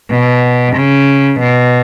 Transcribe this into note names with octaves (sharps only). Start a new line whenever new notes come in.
B2
C#3
B2